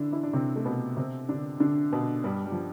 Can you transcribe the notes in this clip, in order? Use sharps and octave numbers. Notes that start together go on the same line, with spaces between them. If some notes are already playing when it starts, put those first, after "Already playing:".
Already playing: D3 E3 D4 E4
E3 E4
D4
C3 C4
A3
B2 B3
C3 C4
D3 D4
D3 D4
B2 B3
G2 G3
G3
F3